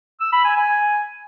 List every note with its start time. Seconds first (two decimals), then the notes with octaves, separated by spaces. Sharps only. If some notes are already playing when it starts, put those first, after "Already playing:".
0.21 E6
0.33 B5
0.45 G#5
0.57 G#5